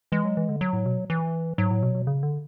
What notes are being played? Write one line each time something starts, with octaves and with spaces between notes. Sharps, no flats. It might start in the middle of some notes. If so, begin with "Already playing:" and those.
E3 G#3
F#3
E3
D3
F#3
A2
B2
E3
G#2 F#3
A2
B2
B2
C#3
D3